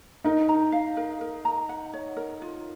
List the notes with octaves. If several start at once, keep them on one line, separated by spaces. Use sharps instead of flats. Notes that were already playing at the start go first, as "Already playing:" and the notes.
D#4 A#4
A#5
F5
A#4
A#4
A#5
F#5
C#5
A#4
F4